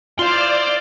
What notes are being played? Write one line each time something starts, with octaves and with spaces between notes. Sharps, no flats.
E4 F4 C5 D5 F5 C6